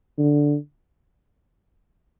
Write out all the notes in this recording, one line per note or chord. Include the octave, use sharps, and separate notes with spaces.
D3